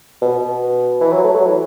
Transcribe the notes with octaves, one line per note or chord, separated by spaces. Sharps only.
B2
B2
E3
F#3
A3
F#3
E3